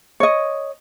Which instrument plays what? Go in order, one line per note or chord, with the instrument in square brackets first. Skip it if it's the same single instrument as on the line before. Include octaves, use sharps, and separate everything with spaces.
[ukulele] C#5 D#5